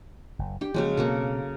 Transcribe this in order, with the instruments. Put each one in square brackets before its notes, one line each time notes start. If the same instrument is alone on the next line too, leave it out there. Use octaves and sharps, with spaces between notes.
[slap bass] F#1
[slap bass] D4 [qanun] G4 G5
[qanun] C#3 F#3 G#3 [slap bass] F3 A#3
[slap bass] B2 C4 [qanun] A#3 F#4 A4